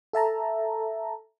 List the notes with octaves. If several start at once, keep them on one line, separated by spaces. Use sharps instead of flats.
A4 E5 A5 A#5